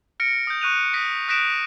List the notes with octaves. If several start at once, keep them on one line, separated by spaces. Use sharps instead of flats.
F6 A#6 C#7 D7
D#6 G6
C#6 F#6 D#7 F7
D#6 A#6 B6 C#7
D#6 F#6 A#6 B6 D7 E7